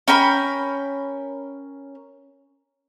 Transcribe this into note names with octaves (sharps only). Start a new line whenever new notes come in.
C#4 A#4 G5 B5